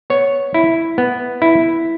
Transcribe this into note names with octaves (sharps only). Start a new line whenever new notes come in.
B3 C#5
E4
B3
E4